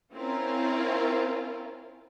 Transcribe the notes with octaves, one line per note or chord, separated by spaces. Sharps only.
C4 C#4 E4 F4 A#4